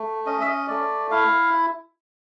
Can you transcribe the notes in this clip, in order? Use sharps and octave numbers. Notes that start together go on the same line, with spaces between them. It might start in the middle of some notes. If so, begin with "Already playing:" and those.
Already playing: A3
C#4 D#5
E5
D#5
A3 D5
E4 F5